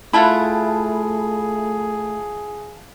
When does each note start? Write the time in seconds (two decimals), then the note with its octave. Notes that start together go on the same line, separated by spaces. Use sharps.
0.13 A3 E4 F4 G#4 E5 F#5 A5 B5